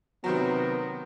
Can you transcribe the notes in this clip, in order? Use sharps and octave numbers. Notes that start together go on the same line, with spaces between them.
C3 D#3 F#3 B3